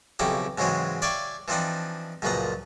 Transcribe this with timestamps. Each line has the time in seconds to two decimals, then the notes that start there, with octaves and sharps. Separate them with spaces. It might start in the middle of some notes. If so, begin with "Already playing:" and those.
0.19 B1 F2 C#3 D#4 E4 G4
0.58 G#2 C#3 E3 F#3 G#3 C4
1.02 D5 E5 F5 G5 G#5 C#6
1.48 E3 F3 C4 D4 D#4
2.22 C#2 F#2 A#2 F3 B4 A#5